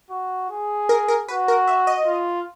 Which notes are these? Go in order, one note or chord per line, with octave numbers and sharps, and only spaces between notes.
F#4
G#4
A#4
A#4
F#4 B4
A#4
E5
D#5
F4